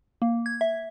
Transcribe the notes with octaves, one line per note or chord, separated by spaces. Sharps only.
A#3
G#6
E5